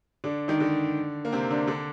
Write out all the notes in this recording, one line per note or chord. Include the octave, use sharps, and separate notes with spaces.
D3 D4
D#3 D#4
D3 D4
A#3
C3 C4
D3 D4
D3 D4